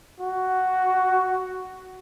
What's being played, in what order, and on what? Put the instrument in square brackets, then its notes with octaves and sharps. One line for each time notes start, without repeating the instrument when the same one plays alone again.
[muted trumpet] F#4